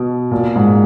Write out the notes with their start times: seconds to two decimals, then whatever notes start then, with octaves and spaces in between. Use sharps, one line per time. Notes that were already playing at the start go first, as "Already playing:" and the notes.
Already playing: B2
0.31 A#2
0.56 G#2